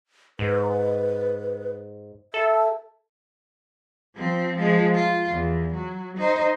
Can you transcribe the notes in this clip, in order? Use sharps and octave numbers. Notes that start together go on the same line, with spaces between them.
G#2 B4
A4 E5
F3 C4
F3 G#3
F4
E2
F#3
D#4 C5